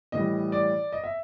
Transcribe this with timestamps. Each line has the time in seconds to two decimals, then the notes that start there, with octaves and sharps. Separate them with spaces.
0.12 A2 E3 G3 D#5
0.52 D5
0.93 D#5
1.04 E5